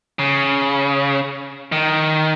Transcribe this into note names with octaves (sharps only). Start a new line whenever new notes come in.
C#3
D#3